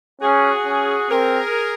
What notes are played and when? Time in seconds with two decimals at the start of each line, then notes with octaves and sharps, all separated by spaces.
0.21 C#4 F#4 G#4
0.66 C#4
1.10 C4 G#4 A#4